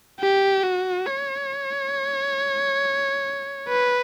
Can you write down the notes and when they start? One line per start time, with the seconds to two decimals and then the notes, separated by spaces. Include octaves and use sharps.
0.20 G4
0.63 F#4
1.06 C#5
3.68 B4